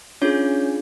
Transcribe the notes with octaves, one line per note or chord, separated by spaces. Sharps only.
C#4 D4 F4 G#4 C#5